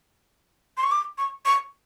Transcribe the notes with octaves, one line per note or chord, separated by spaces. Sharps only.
C6
C#6
D6
C#6
C#6